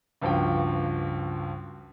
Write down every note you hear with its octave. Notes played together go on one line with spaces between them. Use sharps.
C#2 G2 F3 F#4 G5